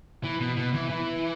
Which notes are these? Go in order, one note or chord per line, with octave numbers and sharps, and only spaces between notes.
E3
B2
B2
E3
E3